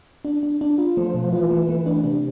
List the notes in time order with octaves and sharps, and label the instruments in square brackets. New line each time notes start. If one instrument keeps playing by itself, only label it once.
[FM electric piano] D4
D4
D4
F4
[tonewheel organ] F3 [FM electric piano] A3
[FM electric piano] B2
[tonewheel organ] E3 [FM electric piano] F4
[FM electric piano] A3
[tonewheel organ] E3 [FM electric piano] A3
[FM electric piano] D4
[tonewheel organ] C3 [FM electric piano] D4